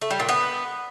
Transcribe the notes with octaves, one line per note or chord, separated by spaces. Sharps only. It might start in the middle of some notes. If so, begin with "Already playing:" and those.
A3
G3
A#2
B3